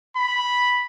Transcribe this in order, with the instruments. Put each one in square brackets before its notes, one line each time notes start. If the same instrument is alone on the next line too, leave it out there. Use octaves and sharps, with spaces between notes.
[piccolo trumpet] B5